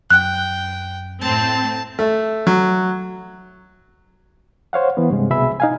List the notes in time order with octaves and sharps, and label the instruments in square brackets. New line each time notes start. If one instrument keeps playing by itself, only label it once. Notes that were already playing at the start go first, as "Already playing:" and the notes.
[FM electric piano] F#2 [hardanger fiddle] G5 [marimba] F#6
[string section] A2 C4 [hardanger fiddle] A5
[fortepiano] A3
F#3
[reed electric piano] C5 C#5 F5 F#5
E3 B3
G2 C3 G#3
C2 B2 G#4 E5 B5 E6
D#4 F5 G#5